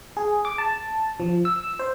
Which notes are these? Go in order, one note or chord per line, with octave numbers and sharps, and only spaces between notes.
G#4
D6
A5
F3
E6
C5